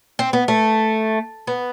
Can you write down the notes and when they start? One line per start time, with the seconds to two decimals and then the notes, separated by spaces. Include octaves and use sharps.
0.19 C4
0.33 B3
0.48 A3
1.47 B3